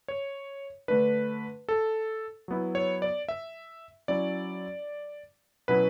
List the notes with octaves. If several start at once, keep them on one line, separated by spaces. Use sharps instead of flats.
C#5
D3 A3 D4 B4
A4
F#3 B3 E4
C#5
D5
E5
F#3 C#4 E4 D5
B2 F#3 C#4 E4 B4